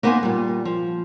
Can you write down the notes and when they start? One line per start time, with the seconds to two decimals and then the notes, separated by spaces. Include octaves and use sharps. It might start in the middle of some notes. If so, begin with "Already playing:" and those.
0.03 A#3 B3 D#4 B4 C5 G#5
0.23 A#2 G3
0.65 F3